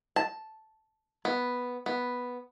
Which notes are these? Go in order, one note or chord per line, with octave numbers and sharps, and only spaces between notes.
A5
B3
B3